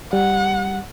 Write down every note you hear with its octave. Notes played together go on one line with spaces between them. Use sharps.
G3 F#5